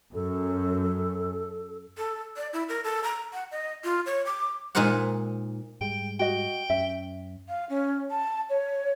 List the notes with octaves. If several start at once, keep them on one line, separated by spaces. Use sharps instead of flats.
F#2 A4
A4
D5
E4
A#4
A4
A#5
F#5
D#5
F4
C#5
D6
A#2 G#3 D#4 A#4 C5 F#5
G#2 G3 G#3 G5
F#4 D#5 G5
F#2 C#4 E5
F5
C#4
A5
C#5